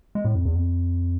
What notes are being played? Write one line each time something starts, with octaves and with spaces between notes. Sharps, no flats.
G#3
A2
F2
E2
F2